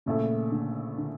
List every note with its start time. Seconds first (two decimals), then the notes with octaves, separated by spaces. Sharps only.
0.06 A#1 A#2 C#3 A3 E4 A4
0.52 D3
0.98 D3